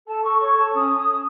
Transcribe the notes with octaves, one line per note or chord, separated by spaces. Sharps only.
A4 A5
A4 C#6
C#5 C#6
A4 A5
C#4 D#6